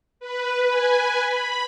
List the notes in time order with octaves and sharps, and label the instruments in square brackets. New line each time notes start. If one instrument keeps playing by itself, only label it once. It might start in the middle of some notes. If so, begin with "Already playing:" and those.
[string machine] B4
G#5
B5